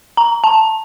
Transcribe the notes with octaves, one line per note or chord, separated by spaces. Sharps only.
A#5
A5